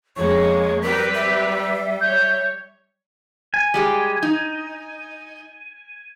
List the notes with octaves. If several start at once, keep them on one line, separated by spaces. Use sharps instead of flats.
F2 G#3 A#3 C#5 C#6
G3 C4 G4 A#4 B4 B6
E5
C#5 G6
G#5
G3 G#3 G4
D#4